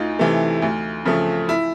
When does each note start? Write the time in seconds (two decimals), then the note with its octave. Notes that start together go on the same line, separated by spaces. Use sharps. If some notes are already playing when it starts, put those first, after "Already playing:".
Already playing: D2 D#4 F4
0.19 C3 E3 A3
0.62 D2
1.05 C#3 F3 A3
1.49 E4